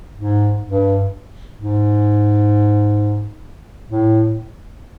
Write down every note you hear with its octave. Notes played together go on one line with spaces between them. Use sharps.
G#2
G2
G#2
A2